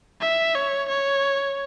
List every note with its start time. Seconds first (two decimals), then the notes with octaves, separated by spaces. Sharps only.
0.21 E5
0.55 C#5
0.89 C#5